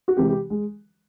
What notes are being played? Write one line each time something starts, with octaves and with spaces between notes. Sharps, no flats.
F#4
C3 E3 G#3 G4
G4
G#3